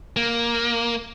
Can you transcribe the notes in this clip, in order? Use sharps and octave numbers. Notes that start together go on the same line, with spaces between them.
A#3